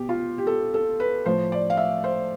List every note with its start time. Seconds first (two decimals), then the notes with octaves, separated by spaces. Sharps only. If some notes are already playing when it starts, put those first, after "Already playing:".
Already playing: B2 G4
0.09 F4
0.38 G4
0.47 A4
0.74 A4
1.00 B4
1.26 A2 F3 C5
1.52 D5
1.70 F5
1.77 E5
2.04 C5